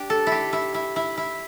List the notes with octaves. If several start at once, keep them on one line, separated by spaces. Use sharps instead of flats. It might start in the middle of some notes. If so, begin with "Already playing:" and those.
Already playing: D4 G4
A4
E4
G4
E4
E4
E4
E4